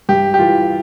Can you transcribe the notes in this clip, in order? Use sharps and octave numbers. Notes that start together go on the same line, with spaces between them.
G2 G4
G4
E3 F4